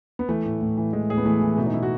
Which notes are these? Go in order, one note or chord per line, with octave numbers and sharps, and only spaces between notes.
B3
E3 A3
A2
A2
E3
E3 G#3
A2 G#4
B3
E3 A3
E3
B2 A3
D#4
B2 E4
F#4